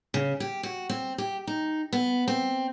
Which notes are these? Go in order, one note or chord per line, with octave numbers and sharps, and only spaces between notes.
C#3
G4
F#4
C4
G4
D#4
B3
C4